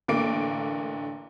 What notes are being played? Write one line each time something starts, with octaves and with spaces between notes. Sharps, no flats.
A1 D3 A#3 D6 D7